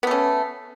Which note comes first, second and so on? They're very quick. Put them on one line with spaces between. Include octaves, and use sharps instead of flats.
B3 A3 C#4